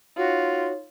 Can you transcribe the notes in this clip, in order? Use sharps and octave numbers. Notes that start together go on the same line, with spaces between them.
D#4 F4 F#4 C#5